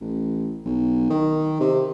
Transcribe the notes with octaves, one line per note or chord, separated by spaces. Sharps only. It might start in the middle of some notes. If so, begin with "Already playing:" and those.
A1
B1
D#3
C3